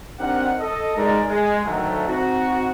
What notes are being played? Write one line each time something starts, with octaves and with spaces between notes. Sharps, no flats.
C4 D4 D#4 G4 A#4 F#5
A4 D#5
G#3 D#4 A#4 D5
G#3
D2 D#3 F#3 A3
C4 D#4 F#4